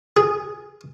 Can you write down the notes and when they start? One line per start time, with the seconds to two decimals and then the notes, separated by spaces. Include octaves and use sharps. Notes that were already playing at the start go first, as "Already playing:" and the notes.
0.17 G#4